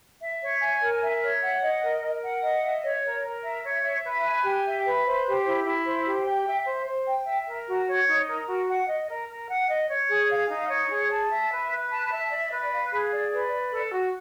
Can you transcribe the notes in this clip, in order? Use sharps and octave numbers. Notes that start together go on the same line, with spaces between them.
E5
C#5
G#5
A#4
E5
C#5
F#5
D#5
A#4
A#4
F#5
D#5
E5
C#5
A#4
A#4
E5
C#5
E5
B4
G#5
G4
E5
B4
C5
G4
E4
E4
C5
G4
G5
E5
C5
C5
G5
E5
A#4
F#4
C#5
D#4
A#4
F#4
F#5
D#5
A#4
A#4
F#5
D#5
C#5
G#4
F5
D#4
C#5
G#4
A5
E5
B4
B4
A5
E5
D5
B4
F5
G#4
D5
B4
D5
A4
F#4